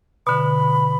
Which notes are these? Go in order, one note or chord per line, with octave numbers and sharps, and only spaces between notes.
B2 D3 B5